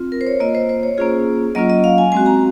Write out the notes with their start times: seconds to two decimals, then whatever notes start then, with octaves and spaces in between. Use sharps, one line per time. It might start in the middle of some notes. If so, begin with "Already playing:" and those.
Already playing: C4 F4
0.12 A#4
0.21 C5
0.27 C#5
0.40 A#3 F4 D#5
0.55 C5
0.69 C5
0.83 C#5
0.98 A#3 C#4 F4 G#4
1.55 F#3 A#3 C#4 F4 D#5
1.70 D#5
1.84 F5
1.98 G#5
2.12 G#3 C4 F#4 G#5
2.26 A#5